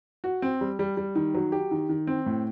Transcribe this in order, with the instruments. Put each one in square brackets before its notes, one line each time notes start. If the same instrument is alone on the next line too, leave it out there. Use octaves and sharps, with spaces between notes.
[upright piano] F#4
C4
G3
G3
G3
D#3
F#3
G4
D#3
D#3
C4
A2